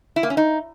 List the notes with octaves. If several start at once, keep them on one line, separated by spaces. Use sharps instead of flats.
E4
A#3
C#4
D#4